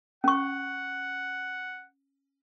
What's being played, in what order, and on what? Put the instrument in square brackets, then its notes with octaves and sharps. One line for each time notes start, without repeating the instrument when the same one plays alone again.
[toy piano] C#4 C#6 [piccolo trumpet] F#5